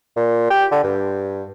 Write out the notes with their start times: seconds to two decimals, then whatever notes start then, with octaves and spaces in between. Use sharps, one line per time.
0.16 A#2
0.50 G4
0.71 D3
0.84 G2